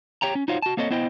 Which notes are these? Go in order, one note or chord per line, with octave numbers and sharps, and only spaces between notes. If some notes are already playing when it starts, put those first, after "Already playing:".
G4 C#5 G5 A#5
C#4
D#4 F4 F#4 C5 C#5 F5
F#4 A5
A#3 C4 A4 C#5 D#5
B3 E4 C5 D#5 G5